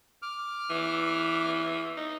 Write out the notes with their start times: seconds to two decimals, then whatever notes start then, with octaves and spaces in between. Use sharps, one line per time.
0.22 D6 F6
0.70 E3
1.97 D#4